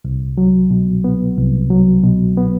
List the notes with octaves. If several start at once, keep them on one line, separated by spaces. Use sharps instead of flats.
C2
F#3
B2
B3
C2
F#3
B2
B3